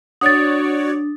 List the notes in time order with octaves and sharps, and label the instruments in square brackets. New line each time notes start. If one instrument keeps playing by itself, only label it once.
[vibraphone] D4 [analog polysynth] F#4 C#5 D5 [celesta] D#6 A6